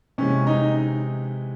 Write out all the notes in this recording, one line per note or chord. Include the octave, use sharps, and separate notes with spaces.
C3 E3 G#3 C#4
D#4